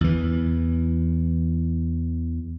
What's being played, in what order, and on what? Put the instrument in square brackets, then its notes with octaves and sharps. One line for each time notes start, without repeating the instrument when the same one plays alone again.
[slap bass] E2 E3